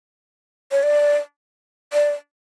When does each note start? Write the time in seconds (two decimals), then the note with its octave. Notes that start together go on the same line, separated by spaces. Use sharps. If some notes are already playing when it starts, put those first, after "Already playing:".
0.72 C#5
0.83 D5
1.93 D5